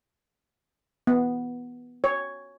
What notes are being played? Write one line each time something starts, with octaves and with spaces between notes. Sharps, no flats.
B3
C#5